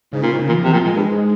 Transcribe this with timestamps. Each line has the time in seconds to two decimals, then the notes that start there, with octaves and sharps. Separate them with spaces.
0.13 G#2 C#3
0.23 A#2
0.33 G#2
0.40 C#3
0.48 A#2 E3
0.58 F3
0.64 C3 E3
0.73 A#2 F3
0.85 A#2 G#3
0.96 G2
1.09 G#2